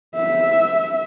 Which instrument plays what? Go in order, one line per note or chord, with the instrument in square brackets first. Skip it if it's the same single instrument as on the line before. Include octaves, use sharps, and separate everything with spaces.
[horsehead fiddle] E5